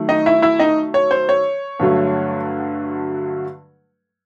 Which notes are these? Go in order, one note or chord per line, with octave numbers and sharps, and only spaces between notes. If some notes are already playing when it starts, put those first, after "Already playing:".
Already playing: D#3 F#3 A3
D#4 D#5
E4 E5
E4 E5
D#4 D#5
C#5
C5
C#5
G2 D3 F#3 A3